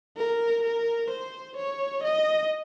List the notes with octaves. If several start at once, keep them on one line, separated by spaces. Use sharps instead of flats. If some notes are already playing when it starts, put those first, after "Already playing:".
A#4
A#4
C5
C#5
D#5